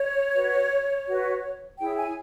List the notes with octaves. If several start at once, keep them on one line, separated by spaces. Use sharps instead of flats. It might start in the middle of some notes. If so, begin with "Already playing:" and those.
Already playing: C#5
F#4 B4
F#4 B4
E4 G#4 C#5 G5
G#5